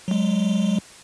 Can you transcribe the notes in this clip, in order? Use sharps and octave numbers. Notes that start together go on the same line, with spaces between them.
F#3 G#3